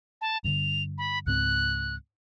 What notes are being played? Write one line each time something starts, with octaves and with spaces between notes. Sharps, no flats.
A5
G2 D3 F7
B5
C#2 G#2 C4 F#6